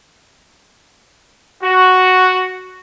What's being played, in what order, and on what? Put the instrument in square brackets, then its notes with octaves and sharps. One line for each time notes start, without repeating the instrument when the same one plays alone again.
[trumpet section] F#4